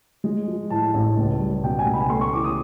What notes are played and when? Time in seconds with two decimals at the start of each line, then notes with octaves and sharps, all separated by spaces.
0.24 G#3
0.48 F3
0.70 A2 A5
0.94 A1
1.17 C#2
1.39 G3
1.64 B2 G5
1.79 G#5
1.86 C#2
1.94 B5
2.10 A3 C6
2.21 C#6
2.33 E3 D6
2.44 D#6